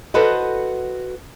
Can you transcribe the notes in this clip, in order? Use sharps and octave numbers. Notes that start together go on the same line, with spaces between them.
F#4 A4 B4 C5 D#5